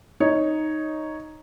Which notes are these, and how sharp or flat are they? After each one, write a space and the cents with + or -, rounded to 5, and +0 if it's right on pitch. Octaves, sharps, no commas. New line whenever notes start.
D#4 +0 C#5 +0